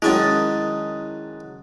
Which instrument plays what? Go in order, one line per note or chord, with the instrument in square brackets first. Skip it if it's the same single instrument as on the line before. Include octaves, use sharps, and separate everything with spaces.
[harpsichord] F#2 D#3 G#3 [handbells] E4 D#6 A6